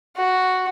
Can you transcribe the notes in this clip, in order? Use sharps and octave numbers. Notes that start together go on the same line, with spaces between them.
F#4